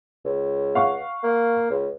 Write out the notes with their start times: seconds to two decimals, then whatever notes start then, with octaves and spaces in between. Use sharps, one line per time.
0.25 C#2
0.75 F5 F#5 C#6
1.23 A#3
1.70 C#2